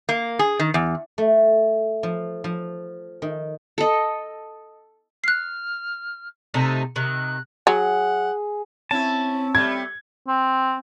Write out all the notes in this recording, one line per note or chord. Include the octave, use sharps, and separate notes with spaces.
A#3
G#4
D#3
E2
A3
F3
F3
D#3
A4 D#5
F6 F#6 C7
C3 A3 D#4
C3 D#3 F#6
F#3 G#4 F#5
C4 C#4 E4 A5
G3 A3 G#6
C4